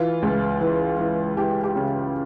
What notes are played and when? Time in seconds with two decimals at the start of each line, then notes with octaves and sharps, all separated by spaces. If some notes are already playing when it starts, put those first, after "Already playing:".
Already playing: E3 F4
0.22 C#2
0.61 E3
0.99 E3
1.37 E3 G4
1.64 G4
1.76 C#3